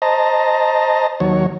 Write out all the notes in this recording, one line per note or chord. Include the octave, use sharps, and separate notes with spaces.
C5 D#5 A5 A#5
D#2 F#3 C#5